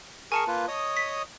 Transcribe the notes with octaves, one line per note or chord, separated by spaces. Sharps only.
G#4 A#4 G#5 A5 C#6 C#7
A#3 F4 B4
C#5 D#5 D#6
B6